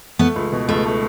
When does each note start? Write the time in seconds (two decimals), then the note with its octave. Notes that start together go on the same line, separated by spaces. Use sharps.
0.19 A3 B3
0.36 C#2
0.52 B2
0.69 C#2 A3
0.85 A3